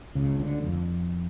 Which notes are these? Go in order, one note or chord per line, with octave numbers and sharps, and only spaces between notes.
C#2 C#3
D2 D3
F2 F3